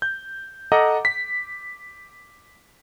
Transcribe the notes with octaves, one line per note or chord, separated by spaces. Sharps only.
G6
A4 D#5 F#5 A#5 D6
B6